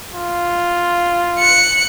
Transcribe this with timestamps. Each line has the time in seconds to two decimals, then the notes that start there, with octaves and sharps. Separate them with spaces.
0.13 F4
1.39 F#6 C#7